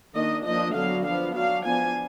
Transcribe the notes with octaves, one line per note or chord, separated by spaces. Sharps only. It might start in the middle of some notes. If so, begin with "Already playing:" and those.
D#3 A#3 D4 D#5
F3 A#3 D4 D#5
D3 F#3 B3 D4 F5
F3 B3 D4 F5
F#3 D4 F5
F3 B3 D4 G#5